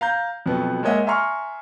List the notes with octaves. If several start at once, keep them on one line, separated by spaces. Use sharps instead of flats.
F5 A#5 G6
F2 B2 F#3 B3
G#3 A#3 C#5 D#5 E5 F#5
E5 G#5 A#5 C6 C#6 F6